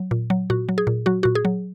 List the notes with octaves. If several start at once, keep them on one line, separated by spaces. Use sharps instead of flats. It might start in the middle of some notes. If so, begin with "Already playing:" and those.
Already playing: F#3
A#2
F#3
A#2 F#4
F#3
G#4
A#2
F#3 F#4
A#2 F#4
G#4
F#3